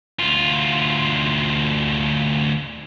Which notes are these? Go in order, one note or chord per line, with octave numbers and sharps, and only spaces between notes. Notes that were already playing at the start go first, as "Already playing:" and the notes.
D2 F4